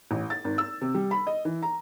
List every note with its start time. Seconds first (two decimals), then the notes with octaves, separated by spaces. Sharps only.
0.11 A1
0.30 A6
0.44 G#1
0.58 E6
0.81 C3
0.94 G3
1.11 B5
1.27 D#5
1.45 E3
1.63 A#5